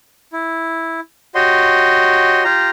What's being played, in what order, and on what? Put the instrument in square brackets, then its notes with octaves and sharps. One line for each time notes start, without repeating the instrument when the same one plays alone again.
[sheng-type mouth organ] E4
F#4 G4 C#5 D#5 C6
F4 G4 A#5